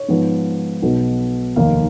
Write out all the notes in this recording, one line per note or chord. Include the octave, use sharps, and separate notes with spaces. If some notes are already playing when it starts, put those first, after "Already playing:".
Already playing: C#5
G#2 F3 B3
B1 B2 F#3 B3
F1 D#2 D#3 A#3 D#4 F5